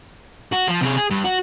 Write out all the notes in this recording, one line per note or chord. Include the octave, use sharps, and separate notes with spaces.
F#4
F3
C3 G#4
G#4
G2
F#4